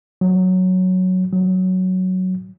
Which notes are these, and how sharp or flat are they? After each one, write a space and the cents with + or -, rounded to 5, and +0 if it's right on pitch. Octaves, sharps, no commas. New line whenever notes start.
F#3 +0
F#3 +5